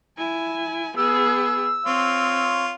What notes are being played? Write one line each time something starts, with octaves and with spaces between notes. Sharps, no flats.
E4 G#5
B3 G#4 E6
C4 F4 C#5